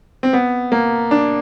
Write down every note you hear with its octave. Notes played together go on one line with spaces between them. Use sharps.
C4
B3
A#3
D4